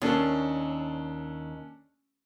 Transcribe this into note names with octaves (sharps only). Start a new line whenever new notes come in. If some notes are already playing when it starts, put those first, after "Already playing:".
D#2 C#4 D4 A4